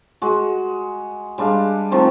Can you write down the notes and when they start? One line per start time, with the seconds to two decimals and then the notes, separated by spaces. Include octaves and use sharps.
0.22 G#3 F#4
1.38 G3 G#3 D4 F5
1.91 D#3 F3 A3 C4